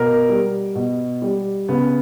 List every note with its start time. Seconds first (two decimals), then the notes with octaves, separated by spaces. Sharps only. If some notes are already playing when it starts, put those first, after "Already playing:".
Already playing: B2 A#4
0.29 G3
0.75 B2
1.22 G3
1.68 C#3 B3